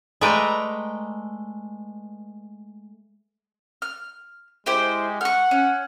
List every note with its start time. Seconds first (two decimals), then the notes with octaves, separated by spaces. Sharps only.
0.21 G#3 A3 B4 D5 G5 A#5
3.82 F6
4.66 G#3 E4 G4 C5
5.21 F#5 C#6 F6
5.51 C#4